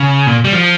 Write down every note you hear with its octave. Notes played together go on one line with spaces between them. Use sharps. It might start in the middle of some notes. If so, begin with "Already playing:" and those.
Already playing: C#3
A#2
G3
F3